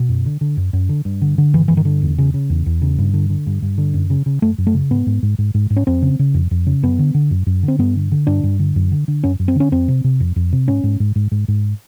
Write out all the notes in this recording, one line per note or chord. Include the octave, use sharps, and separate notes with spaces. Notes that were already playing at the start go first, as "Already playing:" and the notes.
Already playing: B2
F#2
D3
D3
F#2
F#2
D3
G2
D3
D3
G2 E3
G2 E3
D#3
D3
E2
C#3
C#3
E2
E2
C#3
G2
D3
D3
G2
G2
D3
F#2
C#3
C#3
F#2 A3
F#2
A3
C#3
G#2 B3
G#2
G#2
G#2
G#2
G#2
C#4
F2 C4
C#3
C#3
F2
F2
C#3
F#2 B3
D3
D3
F#2
F#2
D3
C4
G2 B3
D3
D3
G2 D4
G2
D3
F#2
D3
D3
F#2 C#4
F#2
C4
D3 C#4
F2 C4
C3
C3
F2
F2
C3
G#2 C#4
G#2
G#2
G#2
G#2
G#2